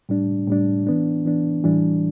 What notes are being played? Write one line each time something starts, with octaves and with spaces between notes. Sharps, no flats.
A2 G3 D4
A2 G3 D4
E3 B3 D4
E3 B3 D4
A2 E3 G3 D4